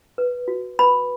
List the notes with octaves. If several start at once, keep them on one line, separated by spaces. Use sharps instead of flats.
B4
F#4
B4 B5